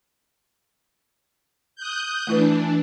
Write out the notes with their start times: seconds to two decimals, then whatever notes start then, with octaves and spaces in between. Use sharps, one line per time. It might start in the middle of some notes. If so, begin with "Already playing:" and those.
1.76 D#6 F#6 G6
2.27 E3 A3 D4 E4 B4